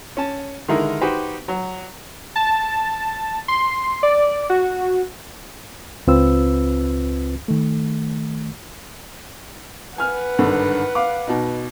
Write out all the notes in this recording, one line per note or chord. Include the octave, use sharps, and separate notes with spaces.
C#4 A5
D3 D#3 G#3 D#4 E4 A#4
D#4 F#4 G4 B4 C5
F#3
A5
C6
D5
F#4
C#2 C4 F4 B4 E6
D#3 A3
B4 F#5 G#5 F6
G#1 G2 D3
F5 D6
B2 D#4